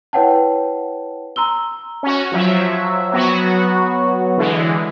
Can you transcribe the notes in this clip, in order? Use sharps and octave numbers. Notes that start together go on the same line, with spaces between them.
E4 B4 C#5 F#5 G5 A5
A#5 C6 E6 G7
C#4 F#4
F3 F#3 E5
F#3 B3 F#4
D3 E3 G#3